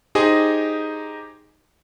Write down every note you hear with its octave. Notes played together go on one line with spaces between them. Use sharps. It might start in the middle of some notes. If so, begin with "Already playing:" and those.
D#4 G4 G#4 C5 D#5 G#5